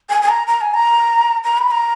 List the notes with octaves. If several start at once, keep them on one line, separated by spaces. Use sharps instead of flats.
G#5
G#5
A#5
A#5
G#5
A#5
A#5
B5
A#5